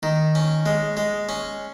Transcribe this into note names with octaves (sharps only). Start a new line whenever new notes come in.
D#3
C#4
G#3
G#3
C#4